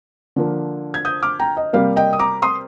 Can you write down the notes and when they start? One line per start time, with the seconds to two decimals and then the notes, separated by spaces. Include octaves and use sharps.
0.36 D3 F3 A#3
0.94 G#6
1.05 D#6 G6
1.22 D6 F6
1.39 G5 A#5
1.57 D#5
1.73 C3 G3 A#3 F5
1.96 D#5 G5
2.13 D#6
2.19 A#5 D6
2.42 C6 D#6